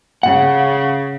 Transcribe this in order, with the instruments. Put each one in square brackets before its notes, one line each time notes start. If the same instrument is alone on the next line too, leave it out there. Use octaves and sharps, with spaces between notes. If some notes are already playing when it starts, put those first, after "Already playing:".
[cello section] C#3 [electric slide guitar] F#5